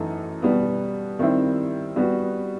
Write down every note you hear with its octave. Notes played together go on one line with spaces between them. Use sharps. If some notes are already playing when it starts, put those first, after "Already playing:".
Already playing: F#2 E3 A3 D#4 A4
B2 G3 B3
D#3 G3 C4 E4
G3 B3 F#4